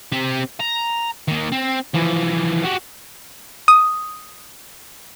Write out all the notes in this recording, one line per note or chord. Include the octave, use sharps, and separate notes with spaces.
C4 G4
A#5
D#3 A#3
C4
E3 F3
F#4 G4
D#6